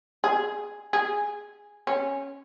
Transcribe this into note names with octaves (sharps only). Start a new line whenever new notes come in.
G#4
G#4
C#4